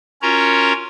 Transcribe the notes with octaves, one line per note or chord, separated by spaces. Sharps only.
C#4 F4 F#4 A#4 C#5 A#5